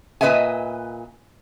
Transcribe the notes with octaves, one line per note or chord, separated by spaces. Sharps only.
A#2 C4 B4 D#5 E5 G#5